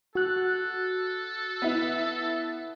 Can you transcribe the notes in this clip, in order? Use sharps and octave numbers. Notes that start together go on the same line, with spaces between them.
F#4 A4 F#6
B3 E4